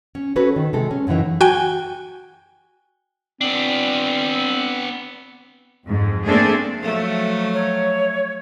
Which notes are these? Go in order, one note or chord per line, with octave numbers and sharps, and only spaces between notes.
C#4
C#4 F#4 A4 B4
D#3
C3 G#3 A4
C#4
F#2 A2 C#3 E3 D#4
F#4 G5 G#5
B3 C4 D4
F2 G#2
A3 A#3 C4 D4 G#4 A4
F3 F#3 A3
C#5